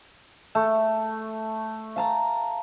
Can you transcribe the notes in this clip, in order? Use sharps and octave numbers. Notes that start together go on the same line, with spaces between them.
A3
F5 A5 A#5